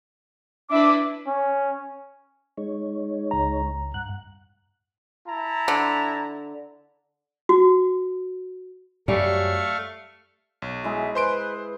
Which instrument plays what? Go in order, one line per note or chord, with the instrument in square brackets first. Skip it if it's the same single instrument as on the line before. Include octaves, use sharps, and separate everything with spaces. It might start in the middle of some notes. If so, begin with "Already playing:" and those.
[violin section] D4 E4 B4 [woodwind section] E5 D6
[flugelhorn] C#4
[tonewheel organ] G#3 D#4 C#5
[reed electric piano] C#2 A#5
[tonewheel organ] G2 F#5 F#6
[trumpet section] E4 A5 A#5
[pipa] D3
[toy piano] F#4
[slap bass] F#2 [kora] G3 [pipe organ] A3 F5 C#6
[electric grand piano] B1
[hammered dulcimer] G#3 E4 G#4 [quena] E5
[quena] B4 [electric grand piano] C5 C6 D7